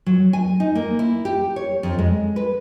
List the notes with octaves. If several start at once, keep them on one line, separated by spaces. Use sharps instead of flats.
F#3
G#5
D#4
A#3
E4
G4
C#5
F2
G#3
B4